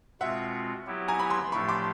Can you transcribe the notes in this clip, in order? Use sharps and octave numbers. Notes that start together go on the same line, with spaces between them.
B2 G#3 C4 F4 E5 F#5
F#3 B3 E4 G4
G#5 A#5
B5
A#5 C6
A2 F3 A3 D4 G4 B5 C#6
C6 D6